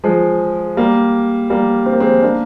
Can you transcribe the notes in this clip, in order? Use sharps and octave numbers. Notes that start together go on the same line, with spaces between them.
F3 G#3
G3 A#3
G3 A#3
C4
A#3
G#3 C4
A#3 D4